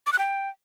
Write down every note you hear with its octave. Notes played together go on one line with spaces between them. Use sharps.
D6
F#6
G5